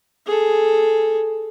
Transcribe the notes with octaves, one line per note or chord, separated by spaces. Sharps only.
G#4 A4